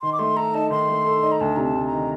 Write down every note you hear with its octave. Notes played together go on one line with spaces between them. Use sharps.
D#3 C6
D6
A3 C6
A4 A#5
D#4 A5
D#3 C6
A3
A4
D#4
A#5
D2 A5
C3 A#5
A5
D2
A#5
D#3